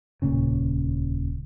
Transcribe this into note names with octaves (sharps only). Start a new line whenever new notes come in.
D#1 C#2 A#2 C#3